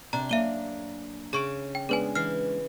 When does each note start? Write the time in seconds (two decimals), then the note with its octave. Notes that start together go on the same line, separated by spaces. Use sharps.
0.13 C3 D4 A#5
0.29 F#2 A#3 E5 F5 D#7 G7
1.33 C#3 G#4 C#6 D7
1.75 G5
1.89 G#3 B3 D4 G#4 B4 G#5
2.15 E3 F6 C7